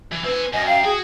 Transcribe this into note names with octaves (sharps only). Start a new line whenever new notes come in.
E3
C4 B4 G#5
F#2 D#5 G#5
F5 G5
F#4 G#4